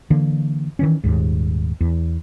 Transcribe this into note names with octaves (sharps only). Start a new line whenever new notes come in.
D3 E3 A#3 D4
D#3 E3 C#4
D#1 G#1 D#2 G#2
E2